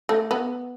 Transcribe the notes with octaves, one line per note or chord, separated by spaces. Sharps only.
A3
B3